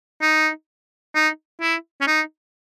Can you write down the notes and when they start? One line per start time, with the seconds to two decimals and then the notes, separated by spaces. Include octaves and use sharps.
0.22 D#4
1.15 D#4
1.61 E4
2.01 C#4
2.07 D#4